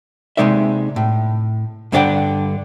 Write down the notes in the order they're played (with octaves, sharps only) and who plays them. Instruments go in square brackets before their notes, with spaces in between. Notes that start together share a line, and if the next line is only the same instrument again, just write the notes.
[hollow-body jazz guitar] C3 F3 G#3 D#4 D5 E5
A2
G2 D3 D4 D5 F#5 G5